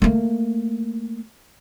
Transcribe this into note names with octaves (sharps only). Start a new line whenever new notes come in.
A3 A#3